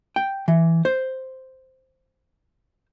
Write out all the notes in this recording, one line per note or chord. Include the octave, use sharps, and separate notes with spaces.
G5
E3
C5